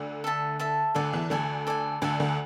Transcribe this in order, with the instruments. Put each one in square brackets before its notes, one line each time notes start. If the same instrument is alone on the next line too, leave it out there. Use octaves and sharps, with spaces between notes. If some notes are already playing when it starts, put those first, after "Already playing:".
Already playing: [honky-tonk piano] D2 D3
[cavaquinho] A4 E5 A5
A4 E5 A5
[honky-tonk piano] D2 D3 [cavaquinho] A4 D5 G#5
[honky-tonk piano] E2 E3
[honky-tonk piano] D2 D3 [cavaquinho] A4 D5 G#5
[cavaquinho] A4 D5 G#5
[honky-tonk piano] D2 D3 [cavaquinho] A4 D5 G#5
[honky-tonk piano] D2 D3